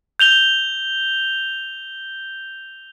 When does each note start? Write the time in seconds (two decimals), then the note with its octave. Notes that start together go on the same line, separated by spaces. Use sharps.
0.19 G6 F7 G7